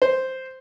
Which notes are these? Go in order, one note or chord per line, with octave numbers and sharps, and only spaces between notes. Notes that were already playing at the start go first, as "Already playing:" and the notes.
C5